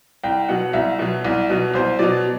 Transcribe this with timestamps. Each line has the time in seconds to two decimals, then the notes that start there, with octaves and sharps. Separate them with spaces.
0.24 C2 G5
0.49 B2 F#3 F#5
0.73 C2 E5
0.99 B2 F#3
1.25 C2
1.50 B2 F#3
1.74 C2 C5
1.99 B2 F#3 D5